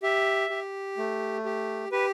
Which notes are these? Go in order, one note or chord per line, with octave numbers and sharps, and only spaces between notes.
G4 E5
G4
A3
G4
G4 B4